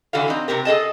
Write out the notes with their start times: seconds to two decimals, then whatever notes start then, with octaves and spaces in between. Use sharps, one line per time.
0.13 D3 E3 F#4 A4 F5
0.28 C4 D#4
0.48 C3 C4 G4 A#4
0.65 G#4 A4 D#5 A5